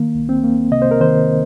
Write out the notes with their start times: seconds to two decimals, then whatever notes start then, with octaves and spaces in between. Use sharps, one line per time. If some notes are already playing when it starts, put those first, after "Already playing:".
Already playing: D#3 A#3
0.15 C2
0.29 C4
0.43 A#3
0.71 C3 D#5
0.82 C5
0.91 A#4
1.01 D#3 C5